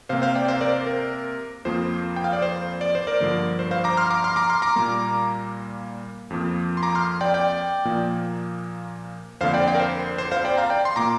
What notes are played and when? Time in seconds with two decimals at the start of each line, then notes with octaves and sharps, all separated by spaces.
0.09 C3 A#3 C5 F5
0.22 C5 F5
0.35 D5 G5
0.48 C5 F5
0.61 A#4 D5
0.73 C5
0.87 A#4
1.65 F2 F3 A#3 C5
2.16 G5
2.24 F5
2.33 D5
2.42 C5
2.81 D5
2.95 C5
3.07 A#4 D5
3.20 G2 D3 F3 A#3
3.59 C5
3.71 C5 F5
3.84 A#5 D6
3.97 C6 F6
4.11 A#5 D6
4.24 C6 F6
4.36 A#5 D6
4.50 C6 F6
4.62 A#5 D6
4.76 A#2 G3 A#3
6.30 F2 F3 A#3
6.77 C6
6.83 A#5 D6
6.95 C6 F6
7.21 D5 G5
7.34 D5 G5
7.85 A#2 F3 A#3
9.41 F2 D3 A#3 C5 F5
9.54 D5 G5
9.67 D5 G5
9.75 A#4
9.80 C5
10.18 C5
10.31 C5 F5
10.45 D5 G5
10.57 F5 A#5
10.70 D5 G5
10.85 C6
10.96 A#2 A#3 A#5 D6